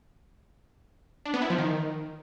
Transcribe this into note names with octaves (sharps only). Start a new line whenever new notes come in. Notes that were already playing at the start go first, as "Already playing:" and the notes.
D4
B3
E4
F3
D#3